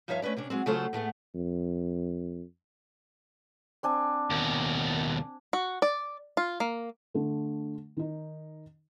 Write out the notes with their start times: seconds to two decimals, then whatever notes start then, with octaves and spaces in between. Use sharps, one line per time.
0.08 G2 F3 D#4 C#5 E5 F5
0.22 A3 C#4 D4 B4 D5
0.37 C3 C#4 D4
0.50 F#3 G#3 C4
0.66 C#3 F#3 A3 F4 A4 C5
0.93 A2 A3 B3 G#4
1.34 F2
3.83 C4 D4 G#5
4.30 D#2 B2
5.53 F#4
5.82 D5
6.37 F4
6.60 A#3
7.14 D3 A3
7.97 D#3 D#4